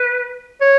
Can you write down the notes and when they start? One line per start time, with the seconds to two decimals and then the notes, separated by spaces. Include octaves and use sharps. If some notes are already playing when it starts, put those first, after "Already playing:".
Already playing: B4
0.61 C#5